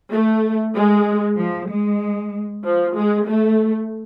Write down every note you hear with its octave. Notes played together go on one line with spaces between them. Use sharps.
A3
G#3
F3
G#3
F3
G#3
A3